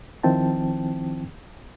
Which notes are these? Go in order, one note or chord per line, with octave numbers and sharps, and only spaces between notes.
D#3 F3 C4 E4 G5 A5